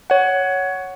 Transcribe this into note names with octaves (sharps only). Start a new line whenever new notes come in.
C#5 F#5